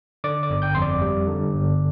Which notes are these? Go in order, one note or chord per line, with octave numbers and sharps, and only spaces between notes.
D3 D5 D6
D5 D6
G1
G5 G6
F2 C6
D5 D6
G3
D3
G1